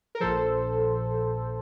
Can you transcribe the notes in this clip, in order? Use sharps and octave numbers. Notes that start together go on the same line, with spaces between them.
A#4
A#1 A#2 F3 A4 C5